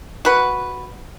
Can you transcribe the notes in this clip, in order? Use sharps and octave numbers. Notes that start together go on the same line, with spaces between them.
F#4 B4